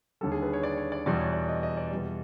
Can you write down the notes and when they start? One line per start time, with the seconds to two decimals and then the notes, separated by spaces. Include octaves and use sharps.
0.21 D#2 D3 G3 A4
0.32 G#4
0.42 B4
0.53 C#5
0.63 D5
0.78 C#5
0.92 D5
1.06 E2 B2 G3 D5
1.19 C#5
1.33 D5
1.49 D#5
1.63 D#5
1.77 D5
1.91 E2 B2 G3